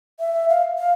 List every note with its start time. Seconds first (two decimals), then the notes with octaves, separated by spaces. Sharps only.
0.20 E5
0.49 F5
0.78 F5